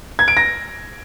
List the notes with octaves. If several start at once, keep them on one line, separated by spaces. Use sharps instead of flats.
G#6
D7
A#6